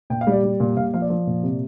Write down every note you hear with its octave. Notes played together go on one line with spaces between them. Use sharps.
A#2 G5
F5
G3 D5
G3
A#2
A#2 F5
F3 F5
D5
F3
A#2
C3